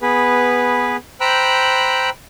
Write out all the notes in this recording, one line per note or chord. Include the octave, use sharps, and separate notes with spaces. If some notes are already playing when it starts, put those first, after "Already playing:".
B3 G#4 B4
C5 G5 A#5 B5 E6 F#6